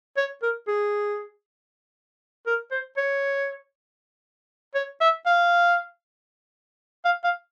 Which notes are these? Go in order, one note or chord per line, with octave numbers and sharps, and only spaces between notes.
C#5
A#4
G#4
A#4
C5
C#5
C#5
E5
F5
F5
F5